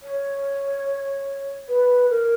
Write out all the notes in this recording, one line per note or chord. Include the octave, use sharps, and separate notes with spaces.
C#5
B4
A#4